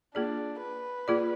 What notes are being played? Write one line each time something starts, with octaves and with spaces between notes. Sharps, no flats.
A#3 D4 F4 G#4 D5
B4
A#3 F4 G#4 D5